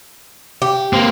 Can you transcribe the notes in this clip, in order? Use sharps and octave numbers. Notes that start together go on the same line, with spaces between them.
G4
A#3 C4